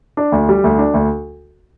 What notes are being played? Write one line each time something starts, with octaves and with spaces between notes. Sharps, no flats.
D4
D2
G3
D2
D4
D2